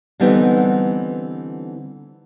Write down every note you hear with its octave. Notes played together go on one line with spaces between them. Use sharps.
D3 E3 G3 B3 C4 D#4